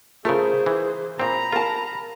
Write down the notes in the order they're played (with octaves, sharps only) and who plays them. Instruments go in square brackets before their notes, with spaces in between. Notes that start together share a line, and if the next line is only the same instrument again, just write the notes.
[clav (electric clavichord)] C#3 A3 [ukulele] F4 A#4 [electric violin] G#4 C5
[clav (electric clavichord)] E3
[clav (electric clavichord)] A#2 C4 [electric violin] A#5 B5
[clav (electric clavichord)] F4 [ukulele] A#4 A5